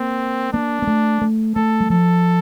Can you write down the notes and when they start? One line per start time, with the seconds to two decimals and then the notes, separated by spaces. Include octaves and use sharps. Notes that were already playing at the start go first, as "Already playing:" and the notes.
Already playing: A#3 C4
0.53 A#3 D4
0.82 A#3
0.87 A3
1.22 A3
1.55 A3 A4
1.80 G3
1.90 F3 A4